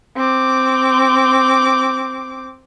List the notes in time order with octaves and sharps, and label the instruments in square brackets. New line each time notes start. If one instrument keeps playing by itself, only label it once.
[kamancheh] C4 D6